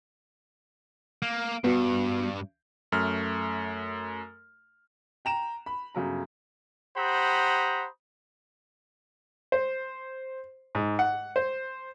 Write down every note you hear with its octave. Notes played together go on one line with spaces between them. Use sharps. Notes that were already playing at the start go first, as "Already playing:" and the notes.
A#3
G2 B3 F#4
F#2 A3 F6
G5 A#5 E7
B5
G1 C#3 F#3 A#5
G4 C5 F#5 A#5 B5 D#6
C5
G#2
F#5
C5